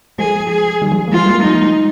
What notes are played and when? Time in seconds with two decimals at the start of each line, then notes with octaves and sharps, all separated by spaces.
0.18 F3 G#3 G#4
0.50 G#4
0.82 D#3 G3
0.92 F3 G#3
1.08 A#3
1.12 F3 G#3 F4
1.23 G3 A#3
1.34 G3 A#3
1.43 F3 G#3 D#4